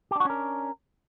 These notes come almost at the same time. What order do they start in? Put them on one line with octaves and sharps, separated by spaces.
G4 D4 F#4 C#4 A#4